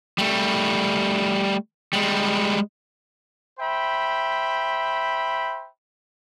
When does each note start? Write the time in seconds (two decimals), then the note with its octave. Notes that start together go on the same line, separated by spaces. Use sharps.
0.18 G3 A3
1.93 G3 G#3
3.59 C5 E5 G5 B5